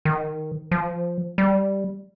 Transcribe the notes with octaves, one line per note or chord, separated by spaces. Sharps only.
D#3
F3
G3